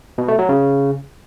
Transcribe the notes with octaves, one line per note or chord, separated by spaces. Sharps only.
B2
A3
F#3
C#3